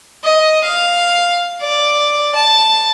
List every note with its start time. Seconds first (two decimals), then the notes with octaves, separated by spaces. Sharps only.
0.24 D#5
0.63 F5
1.62 D5
2.35 A5